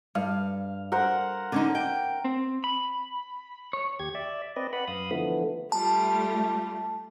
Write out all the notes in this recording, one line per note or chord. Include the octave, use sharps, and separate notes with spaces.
G2 F5
A#4 C5 F#5
D3 C#4 D#4
G5
C4
B5
C#5
D#2 G4 G#6
D5 E5
C4 B4 D5 D#5
B4 F#5 B5
F#2 F5 B5 D#6
D3 E3 F3 A3 B3
G3 A3 F4 A5